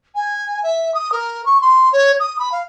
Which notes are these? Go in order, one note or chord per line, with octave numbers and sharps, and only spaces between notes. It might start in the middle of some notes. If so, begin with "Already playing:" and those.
G#5
E5
D#6
A#4
C#6
C6
C#5
D#6
B5
F5